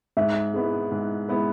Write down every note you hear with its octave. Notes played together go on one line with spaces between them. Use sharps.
G#2 E5
G#3 B3 E4 B4
G#2
G#3 B3 E4 B4